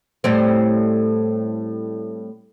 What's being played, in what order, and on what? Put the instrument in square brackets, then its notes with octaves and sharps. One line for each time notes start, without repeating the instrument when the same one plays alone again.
[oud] A2 G3 C4